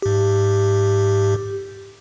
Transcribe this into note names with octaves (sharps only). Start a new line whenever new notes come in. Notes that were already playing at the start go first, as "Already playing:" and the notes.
G#2 G4